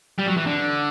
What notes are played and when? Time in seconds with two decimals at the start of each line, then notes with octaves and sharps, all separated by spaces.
0.18 G3
0.27 F#3
0.37 E3
0.46 D3